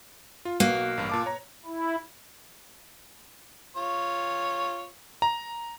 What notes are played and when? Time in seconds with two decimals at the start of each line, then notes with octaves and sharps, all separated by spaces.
0.45 F4
0.60 B1 A#3 F#4 F#6
0.97 A1 G2
1.10 A#2 A5 D6
1.26 C#5 A#5
1.65 E4
3.77 F4 C#5
5.22 A#5